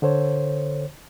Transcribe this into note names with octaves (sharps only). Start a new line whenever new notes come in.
D3 A4 C5 C#5